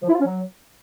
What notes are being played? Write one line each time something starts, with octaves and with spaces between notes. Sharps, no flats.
F3
E4
F4
C#4
F#3